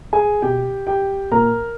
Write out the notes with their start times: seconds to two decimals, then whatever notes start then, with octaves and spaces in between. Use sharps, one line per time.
0.13 G#4 G#5
0.42 B2 G4 G5
0.87 G4 G5
1.31 A#2 A#4 A#5